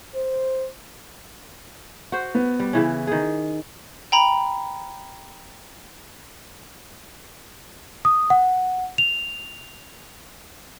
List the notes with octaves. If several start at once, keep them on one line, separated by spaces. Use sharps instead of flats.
C5
F#4 C5
B3
G3
C#3 E3 C#4
D#3 G#4
G5 A#5 B5
D#6
F#5
F7